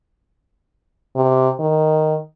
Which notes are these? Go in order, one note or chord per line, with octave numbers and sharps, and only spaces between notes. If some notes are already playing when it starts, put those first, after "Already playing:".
C3
D#3